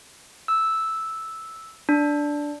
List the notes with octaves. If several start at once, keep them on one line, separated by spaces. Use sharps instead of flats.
E6
D4